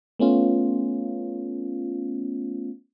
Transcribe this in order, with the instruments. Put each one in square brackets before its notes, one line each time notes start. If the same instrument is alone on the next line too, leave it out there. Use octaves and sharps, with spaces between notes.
[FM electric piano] A3 B3 C#4 F4